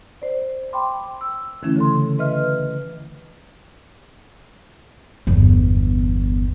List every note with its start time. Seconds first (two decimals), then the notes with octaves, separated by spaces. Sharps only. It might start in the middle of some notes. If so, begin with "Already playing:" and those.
0.22 C5 D5
0.73 G5 B5 C6 D6
1.21 E6
1.63 D3 E3 A3 C#4 E4
1.76 C#3 A4 C6
2.19 B4 D#5 E5 F6
5.27 G1 E2